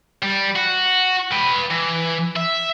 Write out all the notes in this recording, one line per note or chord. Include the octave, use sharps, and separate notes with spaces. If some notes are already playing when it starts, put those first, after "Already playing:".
G3
F#4
B4 G5
E3
E5